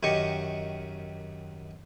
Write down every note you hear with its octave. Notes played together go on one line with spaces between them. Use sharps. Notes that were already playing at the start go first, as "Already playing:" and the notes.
F#2 D#3 G4 D#5 C#6